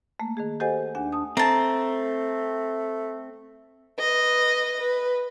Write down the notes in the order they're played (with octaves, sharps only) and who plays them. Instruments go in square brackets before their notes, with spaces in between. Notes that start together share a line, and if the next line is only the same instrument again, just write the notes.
[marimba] A3 A#3
D#3 A3 G#4
G4 A4 C5 D#5 F#5 G#5
D#2 D4 F#5 G#5
D4 A5 D#6
[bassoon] A3 [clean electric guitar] C4 [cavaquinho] A5 A#5
[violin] B4 D#5
B4